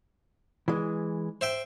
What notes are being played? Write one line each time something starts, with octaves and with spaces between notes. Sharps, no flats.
E3 G#3
C5 E5 G5